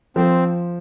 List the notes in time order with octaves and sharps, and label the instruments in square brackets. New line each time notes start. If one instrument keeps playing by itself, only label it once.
[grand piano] F3 [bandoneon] C4